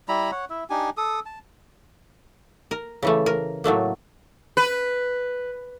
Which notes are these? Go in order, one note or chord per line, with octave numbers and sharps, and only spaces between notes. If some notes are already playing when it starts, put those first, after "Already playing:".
G3 E4 A#5 B5
C#5 F#5
E4 E5
D4 D#4 G4 G#5
A4 D#6
A5
A#4
C#3 E3 A3
A#4
A2 F#3 A3 A#3
B4